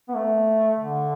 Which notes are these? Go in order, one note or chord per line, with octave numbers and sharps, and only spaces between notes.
B3
A3
D3